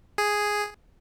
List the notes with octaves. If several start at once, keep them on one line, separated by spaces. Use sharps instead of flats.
G#4